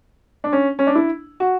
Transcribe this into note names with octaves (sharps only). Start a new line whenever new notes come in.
D4
C#4
C#4
D4
E4
F#4